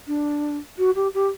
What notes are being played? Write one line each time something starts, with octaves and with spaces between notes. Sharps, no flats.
D4
F#4
G4
G4